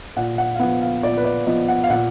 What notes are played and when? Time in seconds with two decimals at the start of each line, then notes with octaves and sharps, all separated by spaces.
0.17 A#2 F#5
0.38 F#5
0.55 F5
0.59 F3 B3 F#5
0.82 F5
1.03 A#2 D5
1.17 B4
1.24 D5
1.46 F3 B3 D#5
1.69 F#5
1.84 F5
1.90 A#2 F#5